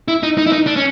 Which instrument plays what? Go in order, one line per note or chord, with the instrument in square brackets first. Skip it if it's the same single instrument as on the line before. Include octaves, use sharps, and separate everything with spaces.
[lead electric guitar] E4
D#4
D#4
E4
D#4
D4
C#4